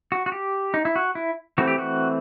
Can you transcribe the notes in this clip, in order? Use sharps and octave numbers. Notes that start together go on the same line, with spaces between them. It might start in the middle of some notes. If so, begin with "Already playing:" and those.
F#4
F#4
G4
D#4
E4
F#4
E4
E3 A3 C4 F#4
G4
F#4